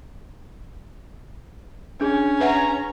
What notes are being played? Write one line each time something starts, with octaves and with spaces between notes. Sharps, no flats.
C#4 D4 G#4
B4 E5 F#5 A#5